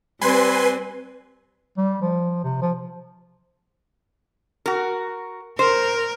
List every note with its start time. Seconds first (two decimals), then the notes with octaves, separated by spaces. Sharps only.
0.21 G3 C4 B4 G#5 C6
1.77 G3
2.02 F3
2.44 C3
2.62 F3
4.66 F#4 A#4
5.59 A#4 C5